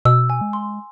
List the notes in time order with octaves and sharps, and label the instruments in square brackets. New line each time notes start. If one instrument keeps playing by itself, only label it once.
[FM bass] B2 [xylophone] E6
[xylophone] G#5
[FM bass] G#3
[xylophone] C6